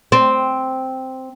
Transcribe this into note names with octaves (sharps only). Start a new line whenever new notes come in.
C4